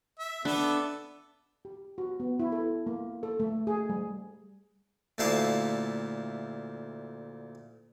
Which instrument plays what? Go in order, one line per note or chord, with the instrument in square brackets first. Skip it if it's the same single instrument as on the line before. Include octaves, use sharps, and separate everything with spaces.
[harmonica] E5
[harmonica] B3 A4 E5 [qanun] D4
[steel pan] G4
F#4
B3
E4
A4
A#3
A4
A3
G#4
G3
[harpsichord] D2 A#2 A3 E4 F5 A5